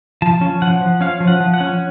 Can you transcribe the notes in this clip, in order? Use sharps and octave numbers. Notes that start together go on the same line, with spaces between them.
F3 A5
C#4
F3 F#5
F3
C#4 F5
F3
F#5
F3
F#5
C#4